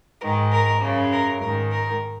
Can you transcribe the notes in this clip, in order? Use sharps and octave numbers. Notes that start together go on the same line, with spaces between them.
G#2 D#3 A#4
A#4
F#2 C#3
A#4
G#2 D#3 A#4
A#4